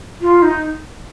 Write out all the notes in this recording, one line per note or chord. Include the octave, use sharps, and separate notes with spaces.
F4
D#4